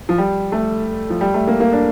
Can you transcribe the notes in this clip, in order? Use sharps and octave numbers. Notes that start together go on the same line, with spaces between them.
F3
G3
A3
F3
G3
A3
A#3
A#3
D4